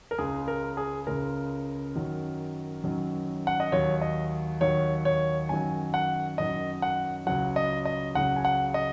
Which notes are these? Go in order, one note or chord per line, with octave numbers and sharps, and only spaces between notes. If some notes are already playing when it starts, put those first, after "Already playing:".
A#4
C#2 C#3 G#3 G#4
A#4
G#4
C#2 C#3 G#3 A#4
F#2 D#3 F#3
F#2 D#3 F#3
F#5
D#5
D#2 D#3 F#3 C#5
D#5
D#2 D#3 F#3 C#5
C#5
F#2 D#3 F#3 G#5
F#5
F#2 D#3 F#3 D#5
F#5
C#2 C#3 F#3 F#5
D#5
D#5
C#2 C#3 F#3 F#5
G#5
F#5
D#5